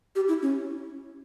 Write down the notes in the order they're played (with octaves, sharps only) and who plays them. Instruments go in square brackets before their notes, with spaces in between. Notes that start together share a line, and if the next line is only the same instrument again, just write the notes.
[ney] G4
E4
C#4